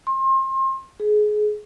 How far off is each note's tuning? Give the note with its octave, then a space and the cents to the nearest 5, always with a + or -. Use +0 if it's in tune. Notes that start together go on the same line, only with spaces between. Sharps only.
C6 +35
G#4 +25